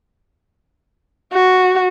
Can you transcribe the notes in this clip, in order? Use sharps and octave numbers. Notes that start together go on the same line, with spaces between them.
F#4